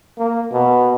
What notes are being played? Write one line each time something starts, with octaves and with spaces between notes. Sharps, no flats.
A#3
B2